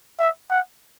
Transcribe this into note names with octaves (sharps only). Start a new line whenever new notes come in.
E5
F#5